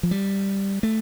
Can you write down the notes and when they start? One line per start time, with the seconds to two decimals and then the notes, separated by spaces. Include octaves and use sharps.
0.03 F3
0.11 G3
0.83 A3